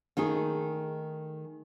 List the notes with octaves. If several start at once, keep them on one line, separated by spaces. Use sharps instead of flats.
D#3 A3 D#4 G#4